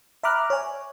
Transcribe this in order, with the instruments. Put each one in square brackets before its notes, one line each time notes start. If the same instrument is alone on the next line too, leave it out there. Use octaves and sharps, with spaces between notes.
[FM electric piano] E5 A#5 B5 D6 F6 F#6
C#5 G#5